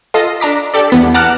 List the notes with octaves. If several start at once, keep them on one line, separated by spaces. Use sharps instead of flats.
F4 A4 D#5 C7
D4 A#5 D6 B6
G4 A4 D5
E2 B3 B6
F#5 A5 A#5 D6 F6 F#6